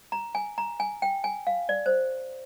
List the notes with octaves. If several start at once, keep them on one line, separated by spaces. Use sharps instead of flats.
A#5
G#5
A#5
G#5
G5
G#5
F5
D5
C5